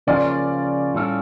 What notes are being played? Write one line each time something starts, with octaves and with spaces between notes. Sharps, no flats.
C#3 F3 A#3 C#4 F4 D5
A2 G3 C#4 F4 A4